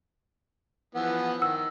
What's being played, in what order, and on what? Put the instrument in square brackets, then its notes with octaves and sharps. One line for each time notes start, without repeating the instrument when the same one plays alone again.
[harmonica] E3 F3 B3 [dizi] F#5
[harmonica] D#3 [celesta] E6